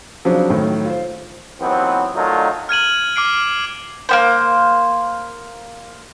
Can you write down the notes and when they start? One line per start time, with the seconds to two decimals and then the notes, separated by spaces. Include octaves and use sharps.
0.25 C#3 F3 F#3 C4 D4
0.50 A2 D#3 F#3
0.85 F4 C5
1.60 D#2 E3 F#3 B3 C4
2.14 D#3 F#3 A3 D4 D#4 F4
2.69 F6 G#6 D#7 F#7
3.16 D6 F6 C7 D7
4.09 A#3 B3 C5